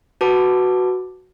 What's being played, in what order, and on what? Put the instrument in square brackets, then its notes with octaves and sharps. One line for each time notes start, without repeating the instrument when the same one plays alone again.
[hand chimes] F#4 B4 A5 D6